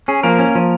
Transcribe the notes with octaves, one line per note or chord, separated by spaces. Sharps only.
C#4 G#4
F3 A#3 A#4
C#4
F3